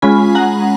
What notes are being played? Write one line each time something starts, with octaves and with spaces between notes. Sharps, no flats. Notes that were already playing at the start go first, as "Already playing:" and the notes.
G#3 C#4 F4 G#5 B5
F#5 A#5